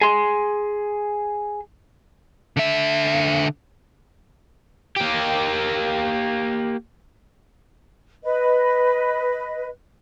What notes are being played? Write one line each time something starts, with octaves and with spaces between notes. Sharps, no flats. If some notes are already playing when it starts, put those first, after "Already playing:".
G#4 C6
D3 E5
A#3 G4
B4 D#5